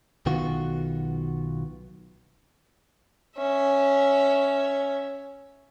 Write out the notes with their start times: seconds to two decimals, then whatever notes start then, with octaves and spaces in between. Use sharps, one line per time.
0.26 B1 D#3 B3 F4 F#4
3.37 C#4 E5